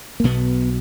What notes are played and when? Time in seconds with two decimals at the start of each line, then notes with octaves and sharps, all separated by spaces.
0.20 A#3
0.24 B1 B2 B3